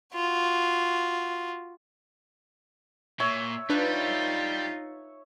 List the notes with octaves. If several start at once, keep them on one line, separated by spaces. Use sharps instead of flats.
F4 F#4
A#2 C#5 E5
G3 D4 D#4 F4 B4